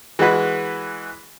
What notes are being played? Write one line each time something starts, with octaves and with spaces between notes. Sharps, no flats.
E3 G#3 F#4 B4